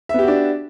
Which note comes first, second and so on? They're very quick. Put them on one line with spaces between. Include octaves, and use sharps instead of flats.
E5 B3 G4 F#4 D4